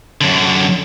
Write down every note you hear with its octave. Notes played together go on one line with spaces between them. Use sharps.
F#2 D3